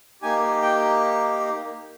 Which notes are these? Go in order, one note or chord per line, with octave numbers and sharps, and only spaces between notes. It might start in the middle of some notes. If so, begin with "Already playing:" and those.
A#3 D#4 G4 G#5
G5